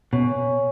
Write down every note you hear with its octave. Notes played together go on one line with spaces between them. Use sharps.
B2 C#4